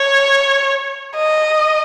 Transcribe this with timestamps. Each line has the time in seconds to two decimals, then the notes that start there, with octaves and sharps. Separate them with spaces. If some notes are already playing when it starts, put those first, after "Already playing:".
Already playing: C#5
1.16 D#5